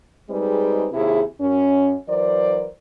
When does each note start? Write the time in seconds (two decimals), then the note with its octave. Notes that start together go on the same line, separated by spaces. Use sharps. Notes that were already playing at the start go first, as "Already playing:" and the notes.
0.29 G3 G#3 C4 D#4 G#4 B4
0.93 D#2 C3 E4 G#4
1.40 F#2 C#4
2.08 E3 F#3 A#4 C5 D5